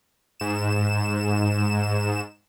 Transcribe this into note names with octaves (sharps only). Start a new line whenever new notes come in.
G#2 E7